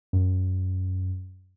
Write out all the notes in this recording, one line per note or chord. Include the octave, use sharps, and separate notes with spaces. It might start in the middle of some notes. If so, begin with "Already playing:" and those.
F#2